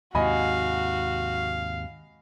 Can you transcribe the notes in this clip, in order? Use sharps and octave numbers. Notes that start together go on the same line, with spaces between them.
D#2 G#2 C3 F#4 D#5 F5 G#5 B5